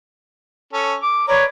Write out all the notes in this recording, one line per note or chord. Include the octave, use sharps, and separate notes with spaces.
C#4 A4
D6
A#4 B4 C#5 D5